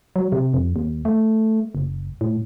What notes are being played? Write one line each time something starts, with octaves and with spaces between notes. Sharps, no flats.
F#3
C3
F2
D#2
A3
F#1
A2